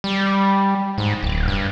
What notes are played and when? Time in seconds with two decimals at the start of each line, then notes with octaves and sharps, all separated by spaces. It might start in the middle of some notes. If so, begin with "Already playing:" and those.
0.04 G3
0.98 G#2
1.23 D1
1.48 G2